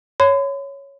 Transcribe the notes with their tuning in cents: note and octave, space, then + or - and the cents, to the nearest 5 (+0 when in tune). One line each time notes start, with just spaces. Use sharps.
C#5 +0 B5 +45